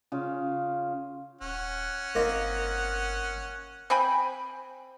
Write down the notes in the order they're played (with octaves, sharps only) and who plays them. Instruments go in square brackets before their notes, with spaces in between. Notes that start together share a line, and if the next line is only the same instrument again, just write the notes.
[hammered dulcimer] C#3 F4
[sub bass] D#1 [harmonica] C#4 F#5
[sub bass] G1 [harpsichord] A#3 C4 D#4
[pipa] C4 G5 G#5 B5